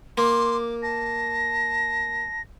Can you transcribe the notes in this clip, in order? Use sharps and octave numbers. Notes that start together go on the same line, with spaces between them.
A#3 C6 D6
A5 A#6